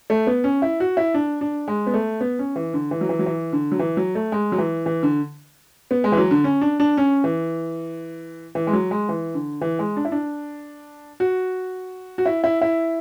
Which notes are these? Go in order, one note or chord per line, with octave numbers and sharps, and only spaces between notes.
A3
B3
C#4
E4
F#4
E4
D4
D4
G#3
B3
A3
B3
C#4
E3
D3
E3
F#3
E3
F#3
E3
D3
F#3
E3
F#3
A3
G#3
F#3
E3
E3
D3
B3
G#3
E3
F#3
D3
C#4
D4
D4
C#4
E3
E3
G#3
F#3
G#3
E3
D3
E3
G#3
D4
E4
D4
F#4
F#4
E4
E4
E4